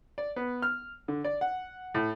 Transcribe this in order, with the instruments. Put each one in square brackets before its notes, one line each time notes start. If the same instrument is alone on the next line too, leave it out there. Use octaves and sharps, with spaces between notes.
[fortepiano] D5
B3
F6
D3
D5
F#5
A2